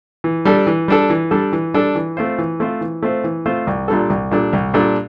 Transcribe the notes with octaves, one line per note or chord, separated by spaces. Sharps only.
E3
G3 D4 A4
E3
G3 D4 A4
E3
G3 D4 A4
E3
G3 D4 A4
E3
A3 C4 F4 C5
E3
A3 C4 F4 C5
E3
A3 C4 F4 C5
E3
A3 C4 F4 C5
C2
A#2 G3 D4 A4
C2
A#2 G3 D4 A4
C2
A#2 G3 D4 A4